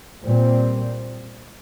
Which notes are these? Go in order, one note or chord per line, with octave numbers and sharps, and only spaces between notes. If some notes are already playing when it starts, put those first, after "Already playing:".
A#2 G3 C4